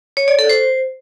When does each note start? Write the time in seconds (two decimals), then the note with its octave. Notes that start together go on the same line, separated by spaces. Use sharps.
0.17 C#5
0.28 D5
0.39 A4
0.49 C5